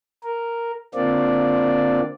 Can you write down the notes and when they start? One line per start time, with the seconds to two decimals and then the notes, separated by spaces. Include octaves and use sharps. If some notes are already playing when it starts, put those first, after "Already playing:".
0.24 A#4
0.95 D3 A#3 C4 D4 F4 D5